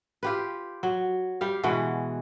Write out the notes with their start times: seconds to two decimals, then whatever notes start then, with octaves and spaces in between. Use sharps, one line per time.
0.23 F4 G4 B4
0.83 F#3
1.41 G3 G4 F5
1.63 B2 E3 G#3 F#4